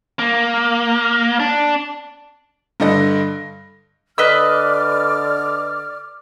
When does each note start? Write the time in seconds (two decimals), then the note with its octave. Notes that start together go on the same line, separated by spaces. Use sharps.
0.19 A#3
1.40 D4
2.80 G2 D3 D4 A4 D#5 A#6
4.18 D3 B4 D5 D#5 D6 E6 F6